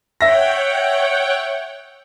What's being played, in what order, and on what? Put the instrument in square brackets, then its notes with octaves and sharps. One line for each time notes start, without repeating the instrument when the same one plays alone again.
[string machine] C#5 F#5 G5 [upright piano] E5 A#6